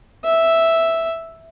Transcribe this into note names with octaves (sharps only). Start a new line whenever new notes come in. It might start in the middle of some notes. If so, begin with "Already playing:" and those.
E5